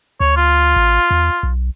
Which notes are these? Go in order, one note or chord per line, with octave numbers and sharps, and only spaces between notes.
D2 C#5
F4
A1
E2
B1